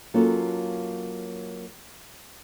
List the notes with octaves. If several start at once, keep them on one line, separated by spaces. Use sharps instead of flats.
F#3 A#3 C#4 F4 A4